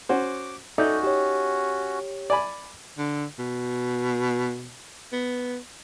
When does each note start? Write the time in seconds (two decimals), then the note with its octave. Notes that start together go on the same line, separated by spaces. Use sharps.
0.09 C#4 F#4 C5 D6
0.78 C#4 D#4 F#4 A4 D5 E5 G6
1.04 G4 C#5
2.30 D5 G#5 B5
2.98 D3
3.39 B2
5.13 B3